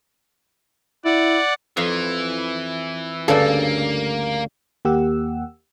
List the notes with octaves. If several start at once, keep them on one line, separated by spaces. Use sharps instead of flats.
E4 D5 F#5
F2 E3 F5
D2 G2 C#3 A#3 A4 D5
D#2 A#3 G4 F#5 E6